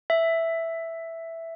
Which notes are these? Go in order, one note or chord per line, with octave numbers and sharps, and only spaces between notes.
E5